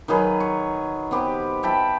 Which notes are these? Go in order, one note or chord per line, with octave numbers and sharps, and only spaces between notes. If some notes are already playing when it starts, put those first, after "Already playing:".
D#3 F#3 G#4 B4
C#6
B3 C4 G4 B4
E5 G5 A5 B5